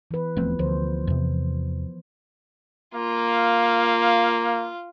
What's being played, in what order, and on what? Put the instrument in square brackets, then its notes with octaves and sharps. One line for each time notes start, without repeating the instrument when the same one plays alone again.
[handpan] E3 B4
[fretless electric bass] D#1 A3 C4 [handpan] F3 B3
[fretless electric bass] D2 [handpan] F3 C5
[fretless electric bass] E2 C3
[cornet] A#3 [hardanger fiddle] F4